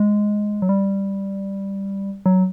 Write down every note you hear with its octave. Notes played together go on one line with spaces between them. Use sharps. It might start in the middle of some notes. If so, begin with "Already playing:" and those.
Already playing: G#3
F#3
G3
F#3